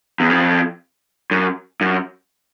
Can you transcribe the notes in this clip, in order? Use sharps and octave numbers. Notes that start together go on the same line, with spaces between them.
E2
F2
F#2
F#2